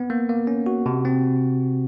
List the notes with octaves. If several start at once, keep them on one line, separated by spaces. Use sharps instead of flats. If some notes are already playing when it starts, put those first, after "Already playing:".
Already playing: B3
A#3
A#3
C#4
F#4
C3
C4